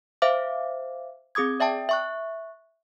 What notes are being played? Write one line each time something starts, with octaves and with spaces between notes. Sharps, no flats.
C5 E5 F5 D6
C4 G#4 D6 D#6 G#6
D5 E5 G5 A5 D#6
E5 C#6 F#6